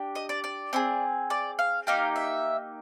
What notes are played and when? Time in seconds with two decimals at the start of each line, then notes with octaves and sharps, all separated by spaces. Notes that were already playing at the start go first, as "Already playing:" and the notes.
Already playing: D4 G4
0.15 D#5
0.29 D5
0.44 D5
0.73 C4 E4 G#4
1.30 D5
1.59 F5
1.87 A#3 D#4 G4 F5
2.16 E5